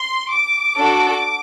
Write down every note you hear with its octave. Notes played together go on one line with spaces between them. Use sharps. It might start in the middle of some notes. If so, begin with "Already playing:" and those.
Already playing: C6
D6
D4 F#4 A4